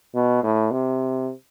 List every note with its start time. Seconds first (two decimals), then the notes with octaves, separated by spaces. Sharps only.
0.15 B2
0.43 A2
0.71 C3